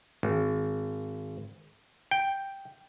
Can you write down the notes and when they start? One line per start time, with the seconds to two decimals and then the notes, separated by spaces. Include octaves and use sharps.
0.23 G#1
2.11 G5